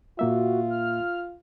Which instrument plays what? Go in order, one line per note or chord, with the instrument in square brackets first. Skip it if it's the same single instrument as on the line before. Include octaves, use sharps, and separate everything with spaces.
[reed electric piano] A#2 A#3 E5 [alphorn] F4 [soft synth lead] F#4
[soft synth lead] F6